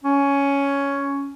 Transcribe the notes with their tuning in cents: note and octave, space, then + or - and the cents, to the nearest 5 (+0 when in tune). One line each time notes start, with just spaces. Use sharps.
C#4 +10